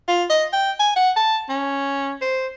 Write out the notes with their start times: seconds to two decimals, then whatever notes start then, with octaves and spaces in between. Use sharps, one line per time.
0.08 F4
0.30 D#5
0.53 G5
0.80 G#5
0.96 F#5
1.16 A5
1.49 C#4
2.22 C5